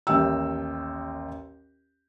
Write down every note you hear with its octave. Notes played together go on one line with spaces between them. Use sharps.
A1 D#2 E5 G5 E6